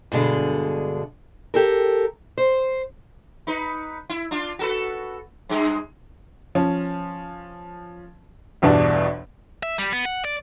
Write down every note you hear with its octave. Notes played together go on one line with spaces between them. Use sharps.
G2 B2 D3 G#3
G4 A4 A#4
C5
D#4 B4
E4
D4 F4
F#4 A4 B4
G2 G#3
F3 C#4
G1 E2 G2 B2 D4 D5
E5
G3
B3
F#5
D5